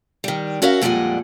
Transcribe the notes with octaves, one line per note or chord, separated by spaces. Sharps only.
D#3 G3
C#4 F#4 A#4 E5 F5
F2 A#2 G3 G#3 F#5 G#5